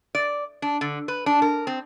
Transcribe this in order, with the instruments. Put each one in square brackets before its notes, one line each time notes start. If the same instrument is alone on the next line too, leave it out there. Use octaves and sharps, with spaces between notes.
[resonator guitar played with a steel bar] D5
D4
D3
B4
D4
A#4
C4